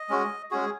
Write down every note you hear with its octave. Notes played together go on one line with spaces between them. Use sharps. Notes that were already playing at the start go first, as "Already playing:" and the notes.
Already playing: D#5
G#3 C#4 F#4
G#3 C#4 F#4 G#4